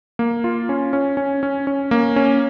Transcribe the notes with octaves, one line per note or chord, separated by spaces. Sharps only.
A#3
F4
C#4
C#4
C#4
C#4
C#4
A#3
C#4